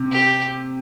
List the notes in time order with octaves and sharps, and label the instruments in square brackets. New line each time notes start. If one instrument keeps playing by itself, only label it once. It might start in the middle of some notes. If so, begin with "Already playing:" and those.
Already playing: [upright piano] C3
[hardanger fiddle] G4